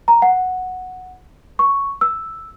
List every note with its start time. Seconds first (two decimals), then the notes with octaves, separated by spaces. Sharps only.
0.08 A#5
0.22 F#5
1.59 C#6
2.01 E6